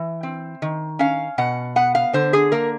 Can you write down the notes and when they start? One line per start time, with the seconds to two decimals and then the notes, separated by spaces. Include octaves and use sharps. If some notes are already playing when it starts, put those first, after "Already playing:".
Already playing: E3
0.23 C4
0.62 D#3
0.99 C#4 F5
1.38 B2 F#5
1.76 B3 F#5
1.95 F5
2.13 D3 C5
2.33 G#4
2.52 A#3 A#4